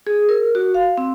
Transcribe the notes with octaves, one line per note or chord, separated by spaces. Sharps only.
G#4
A#4
F#4
F5
C4